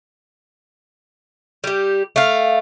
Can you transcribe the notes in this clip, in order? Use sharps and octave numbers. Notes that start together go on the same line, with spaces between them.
G3 G4
A3 F5